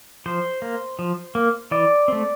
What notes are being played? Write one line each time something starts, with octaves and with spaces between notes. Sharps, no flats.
F3 C5
A#3
F3
A#3
E3 D5
A3 C4